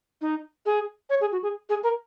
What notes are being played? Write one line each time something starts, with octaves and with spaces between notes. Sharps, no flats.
D#4
G#4
C#5
G#4
F#4
G#4
G#4
A#4